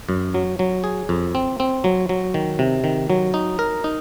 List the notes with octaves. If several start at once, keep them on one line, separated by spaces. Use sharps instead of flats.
F#2
F#3
F#3
G#4
F2
C4
C4
F#3
F#3
D#3
C3
D#3
F#3
D#4
A#4
D#4